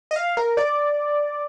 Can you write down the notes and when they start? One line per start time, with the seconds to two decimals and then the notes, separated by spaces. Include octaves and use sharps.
0.11 D#5
0.16 F5
0.37 A#4
0.57 D5